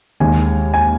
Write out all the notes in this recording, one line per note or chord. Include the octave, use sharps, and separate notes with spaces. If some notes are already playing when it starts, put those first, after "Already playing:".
D#2 D#3 G#3 G#5
G#5